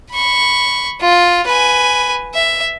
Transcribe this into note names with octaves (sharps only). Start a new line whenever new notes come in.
B5 C#6
F4
B4 G#5
E5